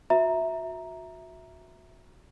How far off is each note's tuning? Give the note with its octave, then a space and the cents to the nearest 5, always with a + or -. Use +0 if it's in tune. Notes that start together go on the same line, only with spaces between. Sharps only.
F#4 -25 E5 -5 A#5 +0